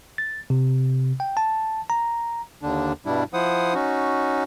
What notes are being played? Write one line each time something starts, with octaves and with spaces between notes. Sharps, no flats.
A6
C3
G5
A5
A#5
D#2 D3 D4
G2 B2 G3 D4 E4
F3 E4 C5 F#5 D#6
C#4 D#4 F#4